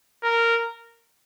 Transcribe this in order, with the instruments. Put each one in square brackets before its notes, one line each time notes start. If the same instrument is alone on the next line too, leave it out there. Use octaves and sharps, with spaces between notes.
[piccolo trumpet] A#4